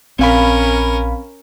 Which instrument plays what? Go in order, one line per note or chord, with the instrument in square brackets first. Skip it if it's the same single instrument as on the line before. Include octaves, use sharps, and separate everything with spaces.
[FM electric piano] A#1 F5 B5 [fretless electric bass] C4 [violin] C#4 A#4